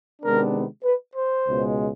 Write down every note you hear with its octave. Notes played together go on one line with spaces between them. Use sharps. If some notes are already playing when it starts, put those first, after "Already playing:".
C3 D#3 G#3 B3 D4 A#4
B4
C5
C#2 B2 G#3